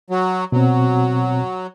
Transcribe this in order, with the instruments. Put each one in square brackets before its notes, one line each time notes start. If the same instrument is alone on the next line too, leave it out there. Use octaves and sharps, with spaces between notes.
[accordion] F#3
[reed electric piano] B2 C4 [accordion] F#3